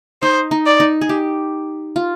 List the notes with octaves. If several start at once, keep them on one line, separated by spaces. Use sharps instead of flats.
D#4 C5
D#4
D5
D#4
G#4
G4
F4